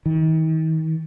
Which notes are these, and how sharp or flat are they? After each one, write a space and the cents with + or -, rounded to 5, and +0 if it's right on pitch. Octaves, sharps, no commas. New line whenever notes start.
D#3 +40